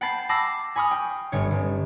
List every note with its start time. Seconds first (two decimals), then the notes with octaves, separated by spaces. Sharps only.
0.01 F#5 G5 A5 B5 A6 C7
0.29 A5 B5 D6 E6 A#6 C7
0.76 G#5 B5 C#6 D#6 F6
0.91 G5
1.32 G1 C#4 C#5
1.51 G1